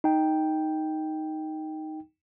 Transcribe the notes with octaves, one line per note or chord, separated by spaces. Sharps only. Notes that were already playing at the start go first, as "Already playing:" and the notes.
D#4 G5